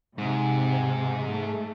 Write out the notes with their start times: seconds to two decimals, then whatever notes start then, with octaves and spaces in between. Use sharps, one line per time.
0.18 G#2 C3
1.27 A3